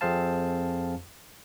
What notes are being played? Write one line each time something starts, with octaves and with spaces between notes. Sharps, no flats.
F2 C4 G#4 C5 F5 A5